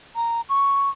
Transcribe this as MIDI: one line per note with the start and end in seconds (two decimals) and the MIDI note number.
0.16 0.41 82
0.49 0.90 85